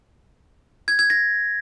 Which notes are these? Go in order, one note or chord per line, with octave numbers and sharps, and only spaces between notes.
G#6
G#6
A#6